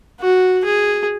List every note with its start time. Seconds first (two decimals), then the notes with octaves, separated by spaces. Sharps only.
0.21 F#4
0.64 G#4